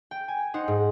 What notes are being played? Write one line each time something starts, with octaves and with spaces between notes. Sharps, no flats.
G5
G#5
D#4 C5 F#5
G#2